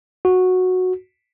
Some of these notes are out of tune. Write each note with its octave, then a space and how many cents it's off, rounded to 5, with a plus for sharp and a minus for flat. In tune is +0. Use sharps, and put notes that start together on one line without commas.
F#4 -10